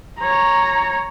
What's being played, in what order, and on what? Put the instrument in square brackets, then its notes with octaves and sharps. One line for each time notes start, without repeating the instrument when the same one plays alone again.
[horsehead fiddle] C#5 A#5